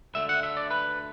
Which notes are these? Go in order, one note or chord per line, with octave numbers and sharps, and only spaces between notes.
D2 D3 A3 E5
F#5
E5
D5
B4